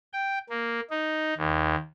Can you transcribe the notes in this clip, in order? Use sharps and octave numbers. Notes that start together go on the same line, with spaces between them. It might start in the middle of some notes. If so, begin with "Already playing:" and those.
G5
A#3
D#4
D#2